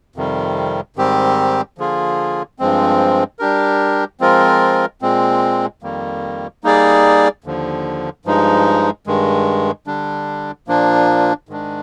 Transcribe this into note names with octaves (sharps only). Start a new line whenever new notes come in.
F2 C3 D#3 G3
G#2 D#3 G3 C4 G4
D3 F3 A#3 F4 G#4
G2 F3 G#3 C4
G3 D4 G4 A#4
F3 G#3 C4 F4 A#4
A#2 G#3 C4
F2 D#3 G3 A#3
G3 A#3 D#4 G#4 D5
D#2 D3 F3
G2 F3 G#3 D#4
G2 D#3 G#3
D3 G3 D4
A#2 F3 A#3 D4
G#2 D#3 G#3 D4